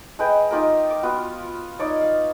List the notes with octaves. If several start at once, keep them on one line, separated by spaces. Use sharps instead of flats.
G#3 B4 G5
D#4 F4 G4 A#4
D6
B3 F4 F#4
D#4 C#5 D5
F5